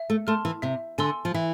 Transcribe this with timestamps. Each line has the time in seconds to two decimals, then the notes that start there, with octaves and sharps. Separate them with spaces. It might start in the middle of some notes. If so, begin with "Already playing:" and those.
Already playing: E5
0.10 A3
0.27 A3 A5 C6 F6
0.45 E3
0.62 C3 E5
0.98 D3 G#5 C6 E6
1.25 F3
1.34 E3 E5